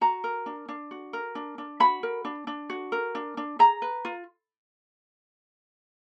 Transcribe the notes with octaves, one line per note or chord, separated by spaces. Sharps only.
F#4 A#5
A#4
D4
D4
F#4
A#4
D4
D4
F#4 B5
A#4
D4
D4
F#4
A#4
D4
D4
G#4 A#5
B4
F4